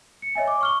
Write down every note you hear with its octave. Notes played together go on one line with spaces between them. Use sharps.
C#7
C#5 D#5 E5 G#5
D6
C#6 F6 G7